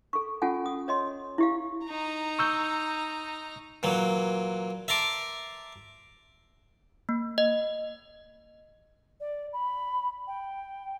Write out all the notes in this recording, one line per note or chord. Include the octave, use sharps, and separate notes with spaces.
A4 C#6
C#4 F4 A4 F#5 G#5
D#6
C#5 D#5 C6
E4 G4 F5
D#4 A#5
C#6 E6 G6
A#2 E3 F#3
E5 A5 A#5 C6 D6
A#3
D#5
D5
B5
G5